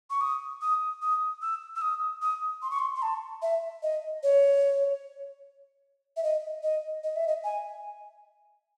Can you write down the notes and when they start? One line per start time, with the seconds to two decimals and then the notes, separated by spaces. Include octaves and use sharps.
0.10 C#6
0.21 D#6
0.61 D#6
1.02 D#6
1.42 E6
1.76 E6
1.82 D#6
2.22 D#6
2.62 C6
2.71 C#6
2.79 C6
2.95 C6
3.02 A5
3.42 E5
3.83 D#5
4.23 C#5
6.17 E5
6.23 D#5
6.63 D#5
7.04 D#5
7.16 E5
7.28 D#5
7.44 G#5